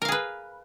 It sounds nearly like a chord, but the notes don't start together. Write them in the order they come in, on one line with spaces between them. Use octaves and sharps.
A#4 F5 G#4 B4